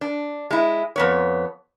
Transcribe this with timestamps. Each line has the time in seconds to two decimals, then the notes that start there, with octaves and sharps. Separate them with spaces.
0.01 D4
0.51 G#3 E4
0.96 F2 B3 C#5